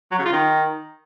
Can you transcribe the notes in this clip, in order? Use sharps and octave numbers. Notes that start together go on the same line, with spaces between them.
F#3
C#3
F4
D#3